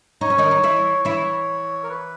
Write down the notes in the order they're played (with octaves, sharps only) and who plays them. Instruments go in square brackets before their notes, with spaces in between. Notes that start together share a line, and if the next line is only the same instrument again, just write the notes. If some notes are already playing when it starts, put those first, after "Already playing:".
[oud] D#4 [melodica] C#5
[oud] C#4
D#3 D#4
D#4
E3 E4
[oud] E3 E4 [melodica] C#5
[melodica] A#4
B4